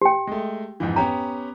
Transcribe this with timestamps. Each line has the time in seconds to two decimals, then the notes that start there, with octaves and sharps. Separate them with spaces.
0.02 G4 G5
0.27 G#3 A3
0.80 F2 G#2 E3
0.96 B3 C#4 G4 A#5